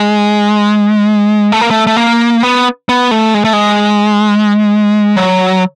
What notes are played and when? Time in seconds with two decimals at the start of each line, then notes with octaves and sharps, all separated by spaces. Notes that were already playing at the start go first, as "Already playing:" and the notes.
Already playing: G#3
1.52 A3
1.61 A#3
1.71 A3
1.87 A3
1.97 A#3
2.43 B3
2.89 B3
3.11 A3
3.34 G#3
3.44 A3
3.53 G#3
5.16 F#3